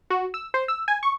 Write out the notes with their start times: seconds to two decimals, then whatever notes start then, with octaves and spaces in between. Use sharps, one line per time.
0.10 F#4
0.34 E6
0.54 C5
0.68 E6
0.88 G#5
1.03 C#6